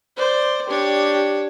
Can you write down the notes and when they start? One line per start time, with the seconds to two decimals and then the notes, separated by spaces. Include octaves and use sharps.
0.17 C5 D5
0.69 D4 G4 C#5